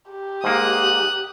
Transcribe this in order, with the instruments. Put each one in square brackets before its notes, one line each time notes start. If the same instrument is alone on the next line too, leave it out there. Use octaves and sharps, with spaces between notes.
[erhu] G4
[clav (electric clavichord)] G#2 A#3 [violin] D#6 F#6